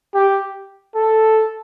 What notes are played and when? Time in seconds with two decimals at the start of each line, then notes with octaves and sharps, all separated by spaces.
0.14 G4
0.95 A4